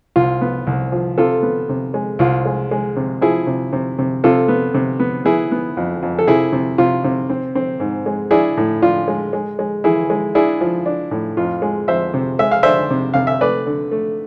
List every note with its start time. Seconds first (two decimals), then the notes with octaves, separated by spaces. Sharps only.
0.16 C2 F4
0.41 B3
0.67 C2
0.92 F3
1.18 C3 F4 A4
1.43 B3
1.69 C3
1.94 G#3
2.19 C2 F4
2.45 G#3
2.71 G#3
2.96 C3
3.21 F3 E4 G#4
3.47 C3
3.73 C3
3.99 C3
4.24 C3 F4 A4
4.48 B3
4.74 C3
5.00 B3
5.25 B3 E4 G#4
5.52 B3
5.77 F2
6.02 F2
6.19 A4
6.27 C3 E4 G#4
6.52 C3
6.78 C3 F4
7.04 C3
7.30 C4
7.55 C4
7.80 G#2
8.06 G#3
8.31 D4 E4 G#4
8.57 A2
8.82 D4 F4
9.08 G#3
9.33 G#3
9.59 G#3
9.84 E3 E4 G#4
10.10 G#3
10.35 D4 E4 G#4
10.61 F3
10.86 D4
11.11 A2
11.37 F2 F4
11.62 G#3
11.88 F2 C5 E5
12.14 C3
12.39 G#3 E5
12.51 F5
12.63 D4 C5 E5
12.91 C3
13.14 C3 F5
13.27 E5
13.41 A3 B4 D5
13.66 D3
13.91 A3